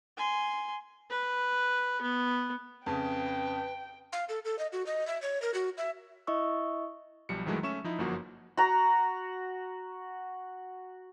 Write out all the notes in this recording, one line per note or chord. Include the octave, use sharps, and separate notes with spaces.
G#5 C6
B4
B3
F2 C#3 B4 G5
F5
A4
A4
D#5
F#4
D#5
E5
C#5
A#4
F#4
E5
E4 D#5 E5 C#6 E6
B1 F3 G3 C#7
F2 D#3 E3 F#3 G#3 A3
A3 C#4 E5 C#6 E7
F3 D#4 E4
G1 F#2 F3 A#3 F#4
F#4 A#5